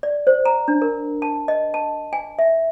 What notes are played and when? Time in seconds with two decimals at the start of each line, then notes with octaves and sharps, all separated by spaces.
0.03 D5
0.27 C5
0.45 A#5
0.68 D4
0.82 A#4
1.22 A5
1.48 D#5
1.74 A5
2.13 G#5
2.39 E5